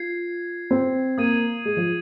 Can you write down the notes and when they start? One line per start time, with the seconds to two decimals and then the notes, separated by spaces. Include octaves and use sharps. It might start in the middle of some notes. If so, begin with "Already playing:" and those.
Already playing: F4 G#6 C7
0.71 C4
1.18 A#3 D#6 G#6 D#7
1.65 G#3
1.77 F3